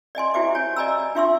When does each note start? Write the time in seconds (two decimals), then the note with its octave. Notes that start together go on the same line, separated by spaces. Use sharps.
0.15 D5 D#5 G#5 C6
0.34 E4 F#4 G4 C5 E5 D6
0.55 C#5 G#5
0.76 D5 D#5 G#5 A#5 B5 E6
1.15 D4 F4 E5 C6 C#6 E6